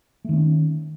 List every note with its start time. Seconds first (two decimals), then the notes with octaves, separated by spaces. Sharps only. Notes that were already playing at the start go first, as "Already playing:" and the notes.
0.25 A3
0.29 D#3
0.33 C4
0.37 C#4